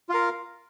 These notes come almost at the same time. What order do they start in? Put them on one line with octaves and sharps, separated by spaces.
F4 F5 A#4